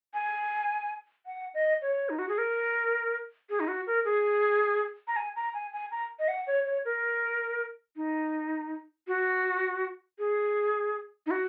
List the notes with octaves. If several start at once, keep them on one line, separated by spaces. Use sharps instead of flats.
G#5
F#5
D#5
C#5
D#4
F#4
G#4
A#4
G#4
D#4
F#4
A#4
G#4
A#5
G#5
A#5
G#5
G#5
A#5
D#5
F#5
C#5
C#5
A#4
D#4
F#4
G#4
D#4
F#4